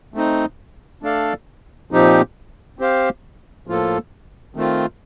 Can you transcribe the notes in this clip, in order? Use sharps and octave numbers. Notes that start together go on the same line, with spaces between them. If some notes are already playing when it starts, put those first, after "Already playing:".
A3 C4 D#4
A3 D4 A4 D5 F5
A#2 F3 C4 D#4 G4
C4 G4 C5 F5
A2 F3 A#3 F4 A4
D#3 A3 C4 F4